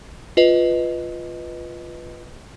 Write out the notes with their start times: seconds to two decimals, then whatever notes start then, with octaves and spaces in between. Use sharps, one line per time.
0.37 F4 B4 D#5